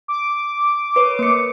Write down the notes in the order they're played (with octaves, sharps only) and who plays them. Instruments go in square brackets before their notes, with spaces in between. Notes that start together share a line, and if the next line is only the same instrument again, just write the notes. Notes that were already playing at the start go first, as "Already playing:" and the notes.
[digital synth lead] D6
[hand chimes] B4 C#5
A#3 C#7